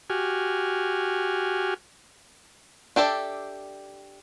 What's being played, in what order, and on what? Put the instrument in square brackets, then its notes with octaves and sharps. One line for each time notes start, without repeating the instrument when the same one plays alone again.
[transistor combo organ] F#4 G4 G#5 F6
[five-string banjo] D4 G4 A4 D5 E5